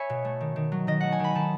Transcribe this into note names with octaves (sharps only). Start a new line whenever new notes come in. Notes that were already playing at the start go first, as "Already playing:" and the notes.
Already playing: C#5 E5 G#5 B5
B2
A3
D#3
D#3
F#3
D#3 D#5
A3 F#5
G#5
D#3 B5
D#3 A5